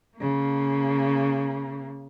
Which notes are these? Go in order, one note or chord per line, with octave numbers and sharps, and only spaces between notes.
C#3 A#3